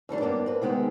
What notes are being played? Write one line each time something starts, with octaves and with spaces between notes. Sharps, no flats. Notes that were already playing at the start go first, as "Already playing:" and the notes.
F2 D#3 G3 D4
G2 A#3 B3 D4
C4 B4
C3 D#3 G#3 B3 C4 G#4